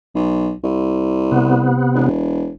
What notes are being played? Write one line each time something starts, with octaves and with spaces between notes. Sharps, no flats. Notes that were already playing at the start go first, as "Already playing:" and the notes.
B1
C2
C3 B3
E1